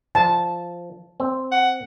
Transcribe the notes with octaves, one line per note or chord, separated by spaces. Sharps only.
F3 A5
C4
F#5